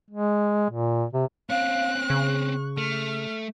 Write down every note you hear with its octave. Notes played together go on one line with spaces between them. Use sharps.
G#3
A#2
C3
C4 C#4 F5 F#6
C#3 C#6
A3 F6